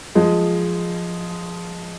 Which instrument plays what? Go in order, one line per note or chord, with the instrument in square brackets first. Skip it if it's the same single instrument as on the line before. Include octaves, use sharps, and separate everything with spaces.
[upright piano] F3 G#3